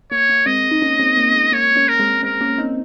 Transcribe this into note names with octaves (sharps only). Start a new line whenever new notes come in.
A#3 C#5
A#3
G#3 C4 D#5
D#4
A#3 C#4
G#3 C4
A#3
G#3
A#3 C#5
A#3 C#4
A#4
G#3 C4
G#3 C4 A#4
A#3 C#4
C4 D#4